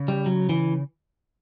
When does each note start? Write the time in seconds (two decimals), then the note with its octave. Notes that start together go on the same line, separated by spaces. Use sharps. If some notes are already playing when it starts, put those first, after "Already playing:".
Already playing: C#3
0.08 G3
0.26 F#3
0.49 E3